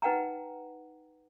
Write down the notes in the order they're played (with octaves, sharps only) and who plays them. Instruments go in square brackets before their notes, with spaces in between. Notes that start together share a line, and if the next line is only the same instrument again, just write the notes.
[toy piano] D#4 B4 F#5 G5 A#5